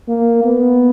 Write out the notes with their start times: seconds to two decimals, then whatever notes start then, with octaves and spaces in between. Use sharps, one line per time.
0.08 A#3
0.44 B3